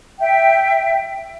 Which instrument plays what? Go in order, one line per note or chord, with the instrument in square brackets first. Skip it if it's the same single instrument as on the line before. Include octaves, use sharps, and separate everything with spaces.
[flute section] E5 G5